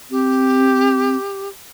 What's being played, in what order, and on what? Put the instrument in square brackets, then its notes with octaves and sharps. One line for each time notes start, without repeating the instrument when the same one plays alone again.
[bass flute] C4 [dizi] G4